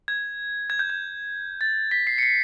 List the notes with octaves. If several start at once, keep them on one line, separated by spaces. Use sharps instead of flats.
G#6
G#6
G6
G#6
A6
B6
C7
C#7
C7